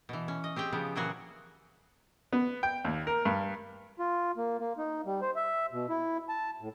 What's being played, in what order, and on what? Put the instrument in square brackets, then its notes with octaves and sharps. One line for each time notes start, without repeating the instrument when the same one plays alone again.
[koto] B2 E3
C#4
D#5
C4 G4 G#4 G5
C#3 F3 B3
A#2 C#3 E3 F#3 F#4 G#4
[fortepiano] B3
G5
D#2
A#4
G2
[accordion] F4
A#3
A#3
D#4
G3
C5
E5
B2
E4
A5
A2